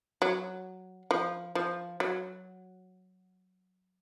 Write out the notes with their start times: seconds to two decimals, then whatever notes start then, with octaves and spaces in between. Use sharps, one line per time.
0.22 F#3
1.11 F3
1.55 F3
2.00 F#3